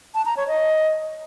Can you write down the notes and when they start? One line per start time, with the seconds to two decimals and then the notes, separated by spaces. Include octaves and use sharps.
0.14 A5
0.26 A#5
0.37 C#5
0.48 D#5